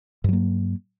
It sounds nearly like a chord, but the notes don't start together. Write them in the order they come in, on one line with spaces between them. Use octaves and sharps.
G2 F#3 A#3